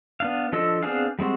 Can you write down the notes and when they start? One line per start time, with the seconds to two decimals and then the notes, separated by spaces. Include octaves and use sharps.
0.20 B3 D4 F5
0.53 F3 D4 A4 D#5 E6
0.83 B3 C4 D4 G#4 F5
1.19 G3 G#3 C4 F#4